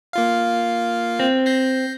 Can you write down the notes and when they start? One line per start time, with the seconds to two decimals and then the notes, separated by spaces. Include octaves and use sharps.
0.13 A#3 F4 F5
1.20 C4
1.46 G6 A#6 C7